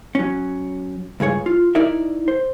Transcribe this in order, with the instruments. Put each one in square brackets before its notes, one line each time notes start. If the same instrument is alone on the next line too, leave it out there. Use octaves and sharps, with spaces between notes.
[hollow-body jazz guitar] F#3 C#4
C#2 G2 G#4 C#5
F4
D#4 E4 A#4 D5 E5
C5